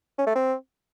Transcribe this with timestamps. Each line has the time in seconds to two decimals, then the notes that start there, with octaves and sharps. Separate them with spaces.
0.19 C#4
0.27 A3
0.35 C4